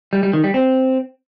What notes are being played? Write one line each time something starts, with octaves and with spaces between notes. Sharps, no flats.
G3
G3
D#3
G3
C4